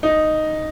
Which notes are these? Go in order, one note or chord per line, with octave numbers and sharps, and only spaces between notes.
D#4